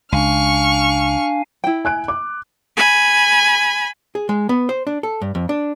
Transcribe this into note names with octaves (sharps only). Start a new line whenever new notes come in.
C#2 D4 F5 G#5 C#6 F6
E4 G5
G#5 F#6 D7
D6
G#5 B5
G#4
G#3
B3
C5
D4
A4
G2
F2
D4